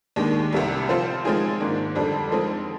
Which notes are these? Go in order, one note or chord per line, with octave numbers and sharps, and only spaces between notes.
D#2 D#3 G#3 D4 G4
C2 C3 G3
F3 C4 F4 C5
F3 G#3 C4 D#4 G#4
G#2 D#3 A#3 D4
F2 D3 G3 D4
F3 G#3 C4 D#4